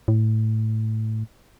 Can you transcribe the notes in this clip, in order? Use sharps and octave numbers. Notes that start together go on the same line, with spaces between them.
A2